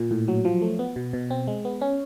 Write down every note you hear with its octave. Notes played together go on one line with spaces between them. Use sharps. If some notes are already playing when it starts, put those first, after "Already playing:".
Already playing: A#2
A2
F#3
F3
A3
B3
B2
B2
C4
G#3
B3
C#4